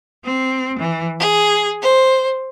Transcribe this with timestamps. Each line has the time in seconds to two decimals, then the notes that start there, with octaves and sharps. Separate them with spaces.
0.24 C4
0.78 E3
1.19 G#4
1.81 C5